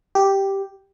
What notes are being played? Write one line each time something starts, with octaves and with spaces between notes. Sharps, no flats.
G4